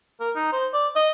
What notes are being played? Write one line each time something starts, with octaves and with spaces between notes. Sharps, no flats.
A#4
D#4
C5
D5
D#5